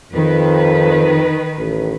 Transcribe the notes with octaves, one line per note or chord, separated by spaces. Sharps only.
F2 D#3 B4
A1